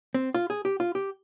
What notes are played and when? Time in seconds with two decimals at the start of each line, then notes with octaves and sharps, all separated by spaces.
0.14 C4
0.34 F4
0.50 G#4
0.65 G4
0.80 F4
0.95 G4